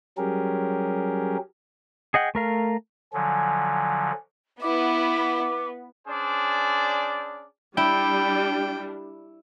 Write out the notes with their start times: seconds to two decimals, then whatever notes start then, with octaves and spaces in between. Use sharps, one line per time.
0.18 F#3 G3 C#4 G4 G#4 A#4
2.14 G#4 D#5 F#5 G5
2.35 A3 A#4 F5
3.13 D3 F3 F#3 G#5
4.62 B3 E4 D6
6.08 C#4 D4 G#4 C5 D5
7.77 G3 D4 E4 G5